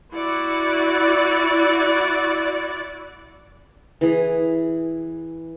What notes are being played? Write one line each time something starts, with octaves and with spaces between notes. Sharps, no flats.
E4 F#4 D5
E3 G#4